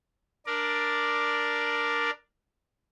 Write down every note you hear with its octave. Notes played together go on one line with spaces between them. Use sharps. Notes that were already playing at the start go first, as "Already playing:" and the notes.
D4 A#4 D5